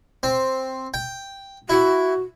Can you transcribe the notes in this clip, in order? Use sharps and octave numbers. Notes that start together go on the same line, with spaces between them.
C4
G5
E4 F#4